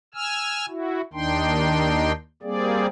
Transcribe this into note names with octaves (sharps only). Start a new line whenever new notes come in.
G#5 E6 F6
E4 F#4
D#2 D#3 D4 D#4 G5 C6
G3 A#3 C4 G#4 D5